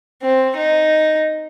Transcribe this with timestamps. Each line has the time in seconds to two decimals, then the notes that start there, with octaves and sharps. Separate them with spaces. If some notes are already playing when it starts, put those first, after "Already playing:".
0.22 C4
0.57 D#4